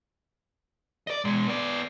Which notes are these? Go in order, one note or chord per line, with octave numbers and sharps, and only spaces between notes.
D5 D#5
B2 G#3
B3 D5